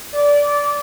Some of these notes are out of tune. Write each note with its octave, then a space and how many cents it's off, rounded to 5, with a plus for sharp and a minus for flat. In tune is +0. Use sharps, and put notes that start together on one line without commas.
D5 -20